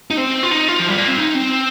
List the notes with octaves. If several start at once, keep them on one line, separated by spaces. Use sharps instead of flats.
D#4
C4
F4
D#4
F4
F3
G3
A#3
C4
D#4
C4